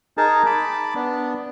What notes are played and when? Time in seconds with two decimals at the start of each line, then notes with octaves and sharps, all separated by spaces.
0.18 D#4 G#4 A#4 A5
0.46 A5 B5 D6
0.95 B3 D4